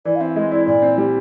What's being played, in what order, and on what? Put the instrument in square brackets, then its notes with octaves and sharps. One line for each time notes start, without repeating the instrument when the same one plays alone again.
[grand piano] E3 [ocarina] D5
[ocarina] F5
[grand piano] C4 [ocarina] E5
[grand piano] G#3 [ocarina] D#5
[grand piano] E4 [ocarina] D5
[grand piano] A#2 [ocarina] D5
[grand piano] C4
G3